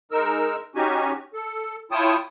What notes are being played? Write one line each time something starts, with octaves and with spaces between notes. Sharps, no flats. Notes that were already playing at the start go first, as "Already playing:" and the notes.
G#3 D#4 A#4 E6
C#4 D#4 F#4 G4 G#5
A4
E4 F4 C#5 G5 A5 D#6